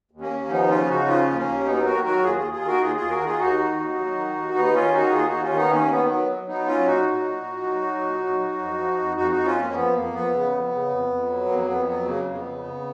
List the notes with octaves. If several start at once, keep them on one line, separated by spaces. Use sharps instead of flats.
D#2
A#3 C#4
D#2
F3 B3 D#4
C#3 C#4 F4
C#3 D#4 F#4
F3 C#4 F4
D#2
A#3 C#4
D#2
F#3 B3 D#4
D#3 F#4 A#4
F#3 F#4 A#4
D#2 F4 G#4
D#2 F4 G#4
F4 G#4
D#3 F#4 A#4
D#2 F4 G#4
D#2 F4 G#4
F#4 A#4
D#3 F4 G#4
D#2 D#4 F#4
D#3
D#2
F#3
D#3
D#2
D#2 B3 D#4
D#2 C#4 F4
D#3 D#4 F#4
D#2 F4 G#4
D#2 D#4 F#4
C#4 F4
D#3 B3 D#4
D#2 A#3 C#4
D#3 B3
F#3 B3
F#3
F#3 B3 D#4
F#3 C#4 F4
A#2 D#4 F#4
F#3
A#2
A#2
F#3
F#3
A#2
F#3
F#3
F2
F3
F2
F2 D#4 F#4
D#4 F#4
F2
C#4 F4
F2 A#3 C#4
F3 B3
F2 A#3
F2 B3
C#3
F2
C#3
F2
F2
F#3
F2 A#3
F2 B3
F#3 B3
C#3 A#3
F2
B3
C#3
C#3